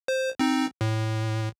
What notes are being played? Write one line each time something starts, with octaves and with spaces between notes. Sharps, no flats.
C5
C4 D#4
A2